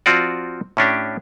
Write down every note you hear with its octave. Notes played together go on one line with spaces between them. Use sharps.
F3 C4 F4 F#4 D5
A2 C#4 D4 G4